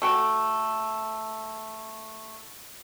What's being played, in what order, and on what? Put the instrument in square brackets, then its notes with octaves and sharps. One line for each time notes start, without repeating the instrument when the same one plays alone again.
[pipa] A3 F#4 G5